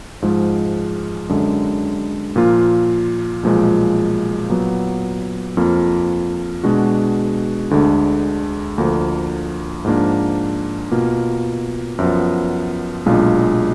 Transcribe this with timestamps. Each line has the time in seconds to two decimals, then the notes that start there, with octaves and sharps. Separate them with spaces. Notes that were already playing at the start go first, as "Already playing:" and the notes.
0.22 G#2 F3 G#3
1.29 F#2 D3 G#3
2.36 A#2 F3 A#3 F4
3.43 B1 A#2 F3 G#3
4.49 A#2 F#3 B3
5.57 F2 F3 A#3 F4
6.63 B2 G#3 D4 F#4
7.71 D2 D3 G#3 D4
8.78 D2 D3 F3 A#3
9.85 G#2 F3 A#3 D4
10.92 B2 A#3 F4
11.99 F#2 F3 B3
13.06 B1 A#2 G#3 D4 F4